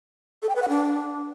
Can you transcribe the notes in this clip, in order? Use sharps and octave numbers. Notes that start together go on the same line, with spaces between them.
A4
G5
B4
F#5
D4